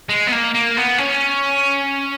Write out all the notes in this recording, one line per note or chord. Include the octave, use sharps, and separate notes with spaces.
G#3
B3
A#3
A#3
B3
C#4